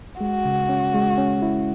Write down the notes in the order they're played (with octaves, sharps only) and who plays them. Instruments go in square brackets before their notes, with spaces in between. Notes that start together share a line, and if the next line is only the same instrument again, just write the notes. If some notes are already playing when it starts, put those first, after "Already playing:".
[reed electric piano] G#3 [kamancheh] F#4
[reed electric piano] C#3
C#4
G#3
C#4
E4